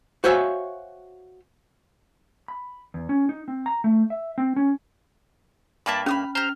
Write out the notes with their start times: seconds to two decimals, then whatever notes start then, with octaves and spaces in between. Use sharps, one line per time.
0.24 F#4 C5 C#5 E5 F5 G#5
2.48 B5
2.94 E2
3.09 C#4
3.29 D#4
3.48 C4
3.66 A#5
3.84 A3
4.10 E5
4.38 C4
4.56 C#4
5.86 G2 A#3 D5 E5 A5 B5
6.06 C#4 B5 D#6 F6
6.35 G4 C5 A#5 F6